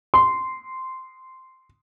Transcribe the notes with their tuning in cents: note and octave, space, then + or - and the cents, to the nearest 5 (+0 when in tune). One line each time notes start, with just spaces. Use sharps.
C6 -10